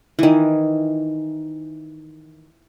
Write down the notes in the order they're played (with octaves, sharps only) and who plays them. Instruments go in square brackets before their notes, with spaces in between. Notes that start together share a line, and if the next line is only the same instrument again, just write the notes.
[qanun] D#3 E3